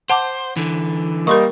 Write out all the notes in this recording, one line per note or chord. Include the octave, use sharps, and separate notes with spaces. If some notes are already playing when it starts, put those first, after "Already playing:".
C5 F#5 A5 D6
D3 E3
G3 A#3 A#4 D#5 C6 C#6